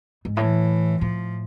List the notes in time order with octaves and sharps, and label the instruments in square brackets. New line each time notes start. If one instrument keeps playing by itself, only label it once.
[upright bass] G#2
[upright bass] A2 [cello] E3
[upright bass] A2 [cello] F3